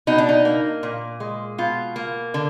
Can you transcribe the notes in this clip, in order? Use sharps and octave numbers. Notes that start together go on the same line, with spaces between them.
B2 D#4
D4
D#4
A#3
A#2
G#3
B2 F4
A#3
D3